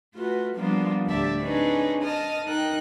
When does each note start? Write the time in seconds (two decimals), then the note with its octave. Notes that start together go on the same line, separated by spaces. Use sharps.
0.15 A3 F4 F#4 B4
0.55 F3 G3 A#3 B3 D4 F4
1.06 D2 A2 G4 D5 E5 A5
1.41 C4 D4 D#4 G#4 B4 C#5
2.03 D#5 A5 D#6 F6
2.45 D#4 A#4 G5 F#6